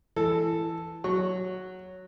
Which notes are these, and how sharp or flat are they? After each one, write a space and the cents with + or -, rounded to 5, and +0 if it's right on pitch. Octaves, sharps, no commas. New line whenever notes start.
E3 +15 A4 +0
F#3 +0 C#6 +0